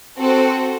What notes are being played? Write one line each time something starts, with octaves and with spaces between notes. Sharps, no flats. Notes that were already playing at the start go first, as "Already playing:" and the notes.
C4 F#4 A4